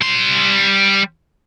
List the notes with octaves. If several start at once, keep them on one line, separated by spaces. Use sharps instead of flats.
G3 C6